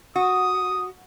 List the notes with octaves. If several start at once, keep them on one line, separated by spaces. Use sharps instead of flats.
F#4 D#6